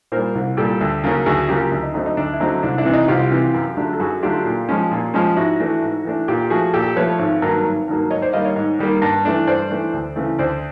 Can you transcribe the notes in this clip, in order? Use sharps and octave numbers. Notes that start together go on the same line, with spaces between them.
A#2 G3 A#4 C5
C2
A#2 G3 G4 A4
D2
C#3 F#3 A#3 C#4
D2 F#4 G#4
C#3 F#3 A#3 C#4 F4 G4
D2
D#4
D3 F#3 A3 C4 D#4
D#4
D2 D4
E4
D3 F#3 A3 C4 D#4
C2 D4
D4 E4
C3 E3
D#4
C2 F4 G4
C3 E3
F#2
D3 F#3 A3 D4
A4
F#2 F#4 G#4
D3 F#3 A3 D4 F4 G4
A#2
F3 G#3 C#4
A#2
F3 G#3 C#4
G#2 E4 F#4
E3 A3 D4
G#2
E3 A3 D4
A#2 F4 G4
F3 A3 F#4 G#4
A#2 G4 A4
F3 A3 B4 C#5
G#1
G2 D#3 F#3 A#3
G#1
G2 D#3 F#3 A#3
G#2 C#5 D#5
C5 D5
D#3 G3 A#3 D#5 F5
C#5 D#5
G#2
D#3 G3 A#3
G2
E3 A3 D4
G2 C5 D5
E3 A3 D4
D2
C#3 E3 A3
D2 C5 D5